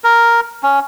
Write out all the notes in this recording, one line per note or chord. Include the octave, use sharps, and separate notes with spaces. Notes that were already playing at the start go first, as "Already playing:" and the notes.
A#4
C#4